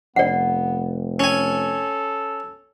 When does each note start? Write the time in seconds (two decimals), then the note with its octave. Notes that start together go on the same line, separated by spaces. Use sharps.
0.16 F1 B3 D5 F#5
1.20 C#4 A4 G#5